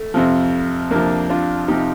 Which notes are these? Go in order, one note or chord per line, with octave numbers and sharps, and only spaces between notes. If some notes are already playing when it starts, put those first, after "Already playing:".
Already playing: A3
F2 C3 F3
F2 C3 F3 A#3 D4
D4 F4
F2 C3 F3 D#4 G4